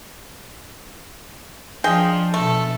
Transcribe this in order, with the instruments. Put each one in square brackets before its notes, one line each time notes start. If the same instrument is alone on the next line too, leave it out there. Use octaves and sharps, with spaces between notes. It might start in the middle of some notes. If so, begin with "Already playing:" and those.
[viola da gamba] F3 D4 [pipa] G#4 D#5 G5
[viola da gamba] B2 A4 [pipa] A3